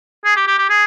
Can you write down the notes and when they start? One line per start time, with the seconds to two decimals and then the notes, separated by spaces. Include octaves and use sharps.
0.25 G#4
0.36 G4
0.47 G4
0.58 G4
0.70 G#4